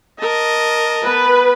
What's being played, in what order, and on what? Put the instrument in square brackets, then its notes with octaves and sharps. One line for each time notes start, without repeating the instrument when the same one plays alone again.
[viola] A#4 A5 [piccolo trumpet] D#5
[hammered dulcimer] B3 G#5 [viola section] B4